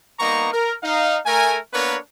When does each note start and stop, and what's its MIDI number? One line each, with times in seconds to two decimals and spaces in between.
0.20 0.50 55
0.20 0.50 58
0.20 0.50 59
0.20 0.50 63
0.20 0.50 82
0.20 0.50 85
0.53 0.74 70
0.84 1.18 63
0.84 1.18 77
1.26 1.57 57
1.26 1.57 70
1.26 1.57 80
1.74 1.97 58
1.74 1.97 59
1.74 1.97 62
1.74 1.97 70
1.74 1.97 71
1.74 1.97 73